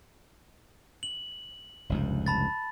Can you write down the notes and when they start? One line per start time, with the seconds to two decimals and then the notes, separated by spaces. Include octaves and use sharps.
1.03 F#7
1.89 F1 C#2 G2
2.26 A5 B5 A6